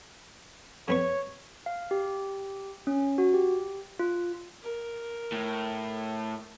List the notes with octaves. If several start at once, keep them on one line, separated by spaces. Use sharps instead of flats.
F2 B3 C#5 C#6
F5
G4
C#4
F#4
G4
F4
A#4
A2